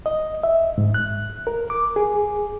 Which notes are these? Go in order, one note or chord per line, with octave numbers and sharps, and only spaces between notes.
D#5
E5
G#2
F#6
A#4
D6
G#4